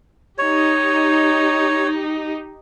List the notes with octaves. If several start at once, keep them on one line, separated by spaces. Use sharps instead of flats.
D#4 G4 C#5